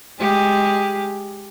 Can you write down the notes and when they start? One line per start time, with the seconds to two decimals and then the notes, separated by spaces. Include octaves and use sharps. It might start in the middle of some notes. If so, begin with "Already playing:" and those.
0.19 G#3 G4 G#4